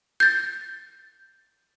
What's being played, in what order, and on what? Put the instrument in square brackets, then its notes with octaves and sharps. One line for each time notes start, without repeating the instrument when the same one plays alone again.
[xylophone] G6 A6